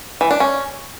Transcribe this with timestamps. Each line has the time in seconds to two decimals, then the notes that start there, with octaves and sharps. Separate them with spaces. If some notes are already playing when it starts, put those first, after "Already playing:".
0.21 E3
0.31 D4
0.40 C#4